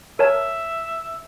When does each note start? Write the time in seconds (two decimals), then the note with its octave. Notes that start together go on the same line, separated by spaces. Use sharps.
0.19 A#4 C#5 E5 A5